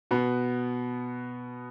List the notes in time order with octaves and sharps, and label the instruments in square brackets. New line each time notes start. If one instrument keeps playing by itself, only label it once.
[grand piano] B2 B3